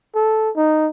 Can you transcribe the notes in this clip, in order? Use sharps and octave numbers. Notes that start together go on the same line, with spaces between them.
A4
D#4